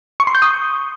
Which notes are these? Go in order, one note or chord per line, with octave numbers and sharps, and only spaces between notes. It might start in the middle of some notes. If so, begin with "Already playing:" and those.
C#6
C6
G6
D#6